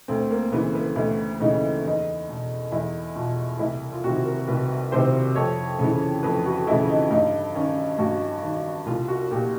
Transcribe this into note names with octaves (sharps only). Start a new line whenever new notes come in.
D2 C4
A#3
C#3 E3 B3
B3
D2 E4
C#3 E3 D#4
E2 D#4
B2
E2 E4
B2 F4
C2 E4
F4
C3 D#3 F#4
A#4
C2 B4
C3 D#3 C5
F2 C#5
C#3
E3
F2 B4
F#4
C#3 E3 E4
D#4
G2 D#4
D#3 C#4
G2 F#4
D#3
C2 F4
F#4
A#2 G4